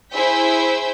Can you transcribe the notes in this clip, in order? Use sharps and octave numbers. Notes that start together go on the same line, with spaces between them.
E4 G#4 C5 E6 G6 B6